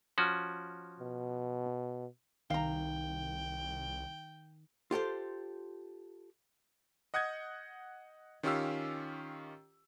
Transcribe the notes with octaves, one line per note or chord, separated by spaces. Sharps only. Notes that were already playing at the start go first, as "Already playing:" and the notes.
F3 C#4 F#4
B2
C2 D#3 F5 G5 A#5
F4 G4 A4 C5
D#5 F#5 D#6 G6 G#6
D#3 C#4 F4 G4 F5 E6